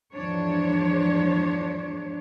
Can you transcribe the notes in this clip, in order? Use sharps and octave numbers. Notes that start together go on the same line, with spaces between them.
E2 G#2 F3 D4 C#5